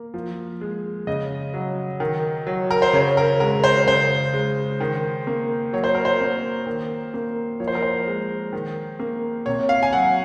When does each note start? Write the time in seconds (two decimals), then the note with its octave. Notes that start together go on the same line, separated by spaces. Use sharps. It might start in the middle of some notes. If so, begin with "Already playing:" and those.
Already playing: A#3
0.14 F3
0.61 G#3
1.07 C#3 D#5
1.54 F#3
2.00 D#3
2.47 F#3
2.71 A#4
2.82 C5
2.93 C#3 C#5
3.17 A#4
3.40 G#3 A#4
3.64 C5
3.87 C#3 C5
4.34 G#3
4.80 D#3
5.27 A#3
5.73 F#3 C#5
5.84 C5
5.95 A#4
6.05 C5
6.21 A#3
6.66 D#3
7.14 A#3
7.60 F3 C#5
7.68 C5
7.75 A#4
7.82 C5
8.07 G#3
8.53 D#3
9.00 A#3
9.46 C3 C#5
9.69 F5
9.83 G#5
9.93 F#3 F#5